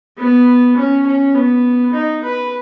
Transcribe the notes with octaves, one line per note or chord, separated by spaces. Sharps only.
B3
C#4
C#4
B3
D#4
B4